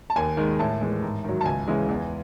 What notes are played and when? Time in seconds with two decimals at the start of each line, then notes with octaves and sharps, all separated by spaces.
0.10 A5
0.16 D#2 G#5
0.37 D#3 G#3
0.59 A2 A5
0.81 E3 G#3
1.02 G#2
1.24 D#3 F#3
1.41 A5
1.45 C#2 G#5
1.68 C#3 E3 G#3
1.89 E2